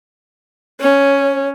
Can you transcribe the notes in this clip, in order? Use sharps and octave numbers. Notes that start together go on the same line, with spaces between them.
C#4 C#5